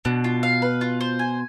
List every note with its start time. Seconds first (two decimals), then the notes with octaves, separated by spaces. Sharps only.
0.05 B2 D4
0.24 F4
0.43 F5
0.62 B4
0.81 F4
1.01 C5
1.19 G#5